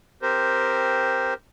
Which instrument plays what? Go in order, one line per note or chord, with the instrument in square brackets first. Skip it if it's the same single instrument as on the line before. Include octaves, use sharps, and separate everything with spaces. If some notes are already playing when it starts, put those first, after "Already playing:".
[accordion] C4 G4 A#4 C5